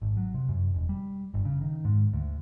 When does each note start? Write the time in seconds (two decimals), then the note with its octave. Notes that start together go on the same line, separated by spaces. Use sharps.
0.02 G#1
0.17 F#3
0.34 C3
0.49 F#2
0.74 E1
0.89 G3
1.34 G1
1.45 C#3
1.61 D#3
1.85 G#2
2.13 D2